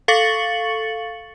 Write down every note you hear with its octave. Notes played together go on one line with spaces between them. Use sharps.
A4 F5 C#6 A6 C#7 F#7